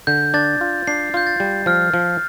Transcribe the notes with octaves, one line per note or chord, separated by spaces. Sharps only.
D3 G6
D4 A6
F4
D4 C7
F4 G6
A6
G3
F3 F6
F3